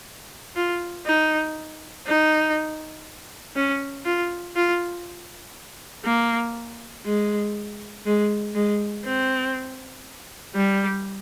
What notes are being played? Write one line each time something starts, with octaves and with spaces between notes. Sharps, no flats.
F4
D#4
D#4
C#4
F4
F4
A#3
G#3
G#3
G#3
C4
G3